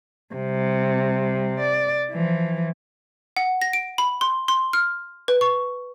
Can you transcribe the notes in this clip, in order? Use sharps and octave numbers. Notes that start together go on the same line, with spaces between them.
C3 G3
D5
E3 F3
F#5
A#6
D7
B5
C6
C6
F6
B4
C#6